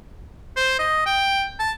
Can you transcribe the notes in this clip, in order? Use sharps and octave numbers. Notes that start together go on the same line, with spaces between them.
C5
D#5
G5
A5